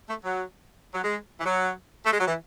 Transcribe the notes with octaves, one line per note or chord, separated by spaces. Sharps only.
A3
F#3
F#3
G#3
E3
F#3
A3
G#3
F#3
E3